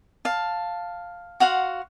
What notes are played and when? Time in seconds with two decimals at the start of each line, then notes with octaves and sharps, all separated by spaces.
0.25 F5 A5
1.40 F#4 F5 F#5 C6